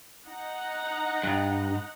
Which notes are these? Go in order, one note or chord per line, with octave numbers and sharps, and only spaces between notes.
D#4 F#5 A#5
G2